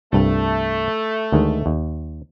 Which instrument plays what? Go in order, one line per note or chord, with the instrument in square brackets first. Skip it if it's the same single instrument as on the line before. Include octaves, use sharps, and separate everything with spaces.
[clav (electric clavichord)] C2 G2 [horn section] A3
[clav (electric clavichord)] D2 D#3 G#3
D#2